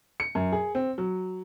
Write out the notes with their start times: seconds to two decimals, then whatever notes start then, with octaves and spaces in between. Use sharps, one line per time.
0.20 C#7
0.35 F#2
0.52 G#4
0.75 C4
0.98 F#3